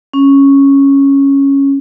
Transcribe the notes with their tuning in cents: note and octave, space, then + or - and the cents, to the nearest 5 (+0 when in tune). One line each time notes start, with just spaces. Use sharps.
C#4 -5